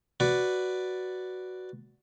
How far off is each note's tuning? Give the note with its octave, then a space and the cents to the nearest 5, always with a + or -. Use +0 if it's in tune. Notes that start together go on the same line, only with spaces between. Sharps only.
F#4 +0 B4 +0 D5 +0